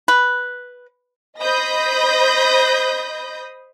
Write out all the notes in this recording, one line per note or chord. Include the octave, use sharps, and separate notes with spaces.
B4
C5 D#5 B5 D#6 G6 A#6